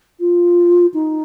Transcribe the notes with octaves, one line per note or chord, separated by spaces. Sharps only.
F4
D#4